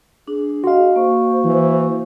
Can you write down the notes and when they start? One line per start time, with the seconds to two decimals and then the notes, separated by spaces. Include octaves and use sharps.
0.28 D4 G#4
0.64 F#4 D#5 F5 C6
0.96 A#3 C5 C#6
1.45 E3